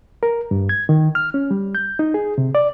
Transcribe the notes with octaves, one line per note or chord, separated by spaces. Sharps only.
A#4
G2
G#6
D#3
F6
C#4
G3
G6
D#4
G#4
C3
D5